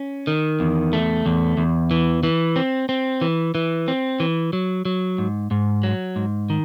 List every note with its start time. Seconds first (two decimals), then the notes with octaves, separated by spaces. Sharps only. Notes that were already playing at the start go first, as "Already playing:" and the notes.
Already playing: C#4
0.27 D#3
0.60 E2
0.93 A3
1.26 E2
1.58 E2
1.91 E3
2.23 E3
2.56 C4
2.89 C4
3.21 E3
3.55 E3
3.88 C4
4.20 E3
4.53 F#3
4.85 F#3
5.18 G#2
5.51 G#2
5.83 F#3
6.16 G#2
6.50 D#3